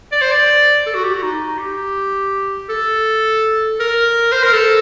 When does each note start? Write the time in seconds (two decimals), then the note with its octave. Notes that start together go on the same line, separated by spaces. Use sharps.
0.12 D5
0.22 C5
0.31 D5
0.86 A4
0.94 F#4
1.04 G4
1.14 F#4
1.23 D#4
1.59 G4
2.69 A4
3.80 A#4
4.32 C5
4.43 A#4
4.53 A4